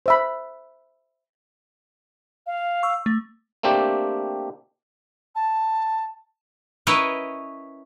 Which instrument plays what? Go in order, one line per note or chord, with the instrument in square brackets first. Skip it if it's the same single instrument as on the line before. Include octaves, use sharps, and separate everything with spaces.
[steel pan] C5 E5 B5
[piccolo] F5
[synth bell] C#6 E6
A3
[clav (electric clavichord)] A3 A#3 C4 D4 G4
[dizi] A5
[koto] C#4 E4 A#4 B4 C#5 D#5